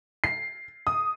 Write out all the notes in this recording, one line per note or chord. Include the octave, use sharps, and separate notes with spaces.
C7
D#6